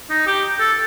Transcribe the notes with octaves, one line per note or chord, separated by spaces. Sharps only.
D#4
G4
A4